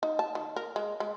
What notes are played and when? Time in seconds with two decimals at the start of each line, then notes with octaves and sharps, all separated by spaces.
0.03 D#4
0.19 A5
0.35 D#3
0.56 A#4
0.76 G#3
1.00 G#3